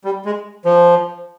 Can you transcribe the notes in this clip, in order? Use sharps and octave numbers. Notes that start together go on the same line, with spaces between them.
G3
G#3
F3